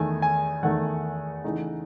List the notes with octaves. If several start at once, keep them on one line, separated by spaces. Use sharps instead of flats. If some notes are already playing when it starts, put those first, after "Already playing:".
Already playing: E2 D#3 A3 G#5
G#5
E2 D#3 A3 F#5
C#3 E3 A3 D#4